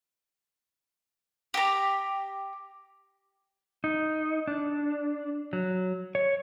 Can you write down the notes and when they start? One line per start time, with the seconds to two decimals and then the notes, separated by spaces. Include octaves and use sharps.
1.54 G4 A#5
3.84 D#4
4.47 D4
5.53 F#3
6.15 C#5